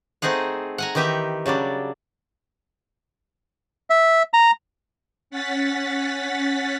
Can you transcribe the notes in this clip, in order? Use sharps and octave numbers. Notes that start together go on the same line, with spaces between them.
A3 C4 D#4 G#4 F#5
F#5 G#5 A#5
D#3 E3 D#4 G4 E5
C#3 F#3 G3 D4
E5
A#5
C#4 F#5 A6 B6